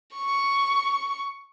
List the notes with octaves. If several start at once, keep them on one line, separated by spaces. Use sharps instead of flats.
C#6